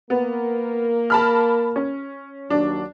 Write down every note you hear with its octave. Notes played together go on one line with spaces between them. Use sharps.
A#3 B3 A#4
A5 B5 F6
C#4
D#2 F#3 D4